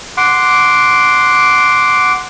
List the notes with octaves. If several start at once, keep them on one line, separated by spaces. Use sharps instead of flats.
F#5 C6 D6